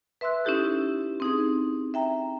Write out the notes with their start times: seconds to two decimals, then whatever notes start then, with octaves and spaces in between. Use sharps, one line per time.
0.21 B4 E5 C6 E6 F#6
0.45 C#4 D#4 E4 G4 A4
1.20 C4 D#4 G#4
1.94 E5 G5 A#5